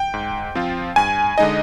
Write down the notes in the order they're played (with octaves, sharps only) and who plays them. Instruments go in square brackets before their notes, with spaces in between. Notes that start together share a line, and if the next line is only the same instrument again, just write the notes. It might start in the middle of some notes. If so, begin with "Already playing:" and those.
Already playing: [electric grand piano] G5
G#2
F3 C4 F4
G2 G#5
D3 G#3 D#4 D#5